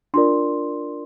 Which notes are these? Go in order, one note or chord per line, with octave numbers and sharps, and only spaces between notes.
D4 F4 A#4 D5 C6